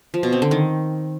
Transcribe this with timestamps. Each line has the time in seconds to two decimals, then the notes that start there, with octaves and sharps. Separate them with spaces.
0.14 F3
0.23 B2
0.32 C4
0.42 D3
0.51 D#3